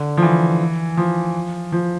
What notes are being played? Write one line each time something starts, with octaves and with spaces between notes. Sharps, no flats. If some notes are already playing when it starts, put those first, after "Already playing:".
Already playing: D3
F3
E3
F3
F3